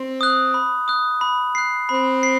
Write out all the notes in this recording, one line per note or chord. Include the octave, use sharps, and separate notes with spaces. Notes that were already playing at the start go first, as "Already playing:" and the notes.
Already playing: C4
D#6 F#6
B5
D#6 F#6
B5
F#6 C7
C4 B5
C7